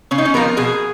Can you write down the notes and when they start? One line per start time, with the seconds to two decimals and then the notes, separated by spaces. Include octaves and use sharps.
0.11 C#3 C#4
0.18 D#4
0.25 C#4
0.34 F3 B3 A#4
0.57 B2 G#4